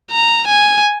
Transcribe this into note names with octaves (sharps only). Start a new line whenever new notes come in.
A#5
G#5